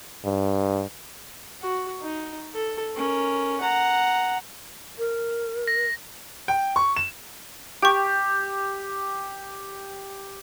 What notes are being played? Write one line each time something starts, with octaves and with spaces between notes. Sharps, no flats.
G2
F#4
D#4
A4
C#4 A#4
F#5 A#5
A#4
A#6
G5
C#6
E7
G4 G5 C#6